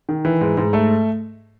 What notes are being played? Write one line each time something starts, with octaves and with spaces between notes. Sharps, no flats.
D#3
E3
G#2
G#2
A3